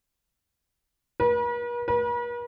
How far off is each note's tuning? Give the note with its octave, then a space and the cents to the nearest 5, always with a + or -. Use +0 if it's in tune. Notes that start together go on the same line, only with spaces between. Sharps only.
B4 -45
B4 -45